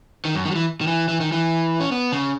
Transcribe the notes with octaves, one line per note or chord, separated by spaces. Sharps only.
D#3
F#2
D#3
F#3
E3
D#3
E3
E3
D#3
E3
C#4
B3
C#3